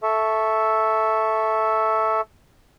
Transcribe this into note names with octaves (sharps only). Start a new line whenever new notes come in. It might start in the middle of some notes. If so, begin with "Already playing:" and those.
A4 E5 C#6